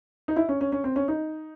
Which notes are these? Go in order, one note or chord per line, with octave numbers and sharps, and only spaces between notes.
D#4
E4
C#4
C#4
C#4
C4
C#4
D#4